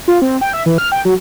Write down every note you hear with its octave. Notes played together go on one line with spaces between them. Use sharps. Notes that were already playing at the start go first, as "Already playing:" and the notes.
F4
C4
G5
E5
E3
F6
G5
F#3